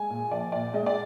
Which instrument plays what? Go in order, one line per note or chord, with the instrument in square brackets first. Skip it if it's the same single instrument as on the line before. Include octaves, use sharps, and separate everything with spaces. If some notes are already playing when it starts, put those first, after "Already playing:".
Already playing: [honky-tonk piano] G#3 G#5
A#2
F3 D5
A#2 D5
G#3 D#5
D5